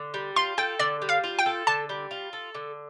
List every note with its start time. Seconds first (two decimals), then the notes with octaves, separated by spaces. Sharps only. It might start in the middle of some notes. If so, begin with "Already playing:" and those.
Already playing: D3
0.14 G3
0.36 F4 C6
0.58 A4 G5
0.79 D3 D5
1.02 G3
1.09 F5
1.24 F4
1.39 G5
1.46 A4
1.67 D3 A5
1.89 G3
2.11 F4
2.33 A4
2.55 D3